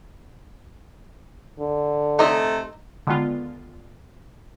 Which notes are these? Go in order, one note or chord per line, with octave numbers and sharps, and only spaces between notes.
D3
C3 A3 D#4 D#5
D3 D#3 G#3 B3 F4